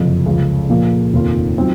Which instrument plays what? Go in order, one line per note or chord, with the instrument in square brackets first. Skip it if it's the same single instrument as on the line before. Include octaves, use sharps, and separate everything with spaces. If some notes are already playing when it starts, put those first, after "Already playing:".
Already playing: [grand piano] F#1 F2 C3 F3
C#2 C#3 F3
A#2 F3 A#3
F1 D#2 D#3 A#3 F4
D#3 F#3 C4 F4